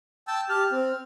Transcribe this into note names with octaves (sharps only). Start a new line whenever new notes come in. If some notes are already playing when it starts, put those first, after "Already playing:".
G5 A5 E6
G4 A5 F6
C4